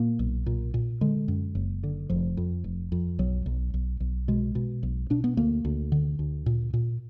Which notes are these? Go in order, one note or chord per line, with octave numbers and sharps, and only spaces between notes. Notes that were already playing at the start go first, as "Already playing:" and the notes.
Already playing: A#2 A#3
B1
A#2
A#2
D3 G#3
F#2
F#1
D3
F1 F3
F2
F1
F2
B1 F#3
B1
B1
B1
B2 G#3
B2
B1
B2 D4
B3
D2 A#3
D2
D3
D2
A#2
A#2